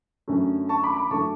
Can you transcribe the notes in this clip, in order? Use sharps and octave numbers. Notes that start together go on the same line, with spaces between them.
F#2 D3 A3 C#4
A5 C#6
B5 D6
B5 D6
F#2 D3 A3 C#4 A5 C#6